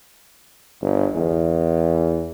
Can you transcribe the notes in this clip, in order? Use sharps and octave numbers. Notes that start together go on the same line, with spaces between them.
G1
E2